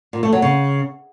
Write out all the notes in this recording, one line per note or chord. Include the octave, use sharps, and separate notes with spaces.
A#2
A3
F#3
C#3